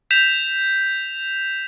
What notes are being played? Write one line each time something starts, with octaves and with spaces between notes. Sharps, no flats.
G6 B6 E7 F7